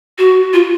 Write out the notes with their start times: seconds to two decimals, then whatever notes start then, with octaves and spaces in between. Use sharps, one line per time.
0.18 F#4
0.53 F4